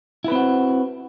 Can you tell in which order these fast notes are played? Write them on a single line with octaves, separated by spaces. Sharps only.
E4 B4 C4 F#4